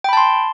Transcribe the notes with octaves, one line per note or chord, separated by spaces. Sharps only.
G5 A5 B5 C6